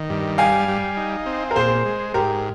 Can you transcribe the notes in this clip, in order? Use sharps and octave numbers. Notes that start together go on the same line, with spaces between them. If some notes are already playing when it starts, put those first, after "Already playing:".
Already playing: D#3
G2
G3 F5 G#5
G3
D#4
C4
A#4
A#2 G#4 C5
G#3
G#2 G4 A#4